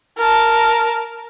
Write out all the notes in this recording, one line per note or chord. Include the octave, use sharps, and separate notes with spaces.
A#4 A5